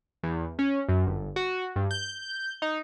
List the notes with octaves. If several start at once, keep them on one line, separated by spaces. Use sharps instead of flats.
E2
C#4
F#2
G1
F#4
G2
G6
D#4